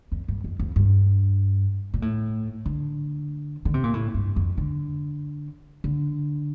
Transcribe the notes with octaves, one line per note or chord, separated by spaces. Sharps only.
F2
G2
F2
F2
G2
A#2
A2
D3
D3
C3
A#2
A2
G2
F2
D3
D3